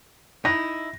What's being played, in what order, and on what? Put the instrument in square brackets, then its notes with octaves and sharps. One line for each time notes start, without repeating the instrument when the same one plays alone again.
[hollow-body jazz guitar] D#4 E4 [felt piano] A#6